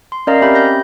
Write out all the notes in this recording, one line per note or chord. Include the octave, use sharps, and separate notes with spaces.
C6
C#4 A#4 D5 D#5 F5 A#5
C4 C#4 G4 E5 B5 G6
G6 A#6